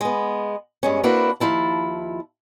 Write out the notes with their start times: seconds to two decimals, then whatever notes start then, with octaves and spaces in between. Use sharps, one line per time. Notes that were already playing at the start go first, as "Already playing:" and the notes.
0.01 G#3 B3
0.83 G2 G#3 C#4
1.04 A#3 C4 D4 E4 F#4 B4
1.40 D#2 F3 E4 A5